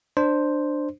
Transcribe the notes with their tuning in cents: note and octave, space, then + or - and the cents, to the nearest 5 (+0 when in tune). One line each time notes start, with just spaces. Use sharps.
D4 +15 C5 +0